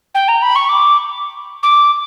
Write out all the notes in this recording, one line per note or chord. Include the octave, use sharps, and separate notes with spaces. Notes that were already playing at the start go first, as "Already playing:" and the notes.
G5
A#5
B5
C#6
D6
D6